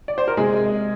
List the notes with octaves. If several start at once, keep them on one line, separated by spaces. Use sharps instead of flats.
D5
C5
A#4
C3 G#3 G#4